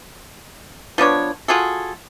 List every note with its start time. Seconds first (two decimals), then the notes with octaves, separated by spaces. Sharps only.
0.98 F3 B3 D4 C#5
1.48 F4 F#4 G#4 A4